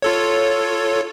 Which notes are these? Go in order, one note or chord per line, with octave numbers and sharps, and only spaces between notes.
F4 A4 C#5